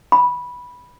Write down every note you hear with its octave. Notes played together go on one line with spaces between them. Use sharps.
B5